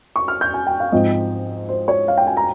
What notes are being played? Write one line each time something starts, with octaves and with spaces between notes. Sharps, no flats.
C#6
F6
G6
G#5
G5
F5
G#2 F3 C4 D#5
C5
C#5
F5
G5
G#5
A#5